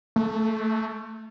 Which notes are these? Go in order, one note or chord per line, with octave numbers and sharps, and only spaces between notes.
A3